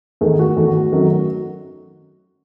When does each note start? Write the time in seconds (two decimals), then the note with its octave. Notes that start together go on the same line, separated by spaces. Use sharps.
0.21 E2 D#3 A3 G#4
0.39 F#4
0.57 E2 D#3 A3
0.92 F#2 D#3 F#3 A3